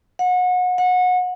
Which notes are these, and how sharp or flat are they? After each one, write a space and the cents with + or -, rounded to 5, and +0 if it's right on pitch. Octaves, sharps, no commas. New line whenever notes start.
F#5 -30
F#5 -25